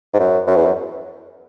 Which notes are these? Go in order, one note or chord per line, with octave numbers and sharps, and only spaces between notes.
G#2
F#2
F#2
E2
F#2